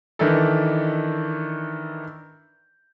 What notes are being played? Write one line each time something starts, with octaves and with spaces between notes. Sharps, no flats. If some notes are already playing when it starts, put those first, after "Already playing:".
D#3 E3 D4 E4 A4